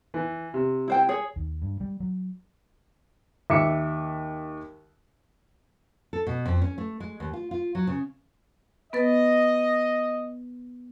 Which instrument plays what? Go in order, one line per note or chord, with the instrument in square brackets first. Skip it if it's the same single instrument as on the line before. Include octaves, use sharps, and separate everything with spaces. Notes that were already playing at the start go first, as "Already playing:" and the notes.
[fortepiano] E3
C3
[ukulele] E4 C5 G5
G#4 C#5
[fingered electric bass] D#2
G2
G3
F#3
[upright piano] D#2 E5 D6 C#7
[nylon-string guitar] A4
B2
F2
C#4
A3
G#3
D#2
F4
F4
F#3
C#3
[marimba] B3 B4 A6 [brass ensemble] D#5